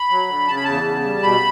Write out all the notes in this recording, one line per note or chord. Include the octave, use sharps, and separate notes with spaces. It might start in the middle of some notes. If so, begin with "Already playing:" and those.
Already playing: B5
F#3
D3
C#3 A5
B5
E2 A5
C#3
G3
B2 B5